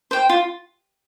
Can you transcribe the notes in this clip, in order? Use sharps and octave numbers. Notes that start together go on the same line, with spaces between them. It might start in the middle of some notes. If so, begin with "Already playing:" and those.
C5 G5
F4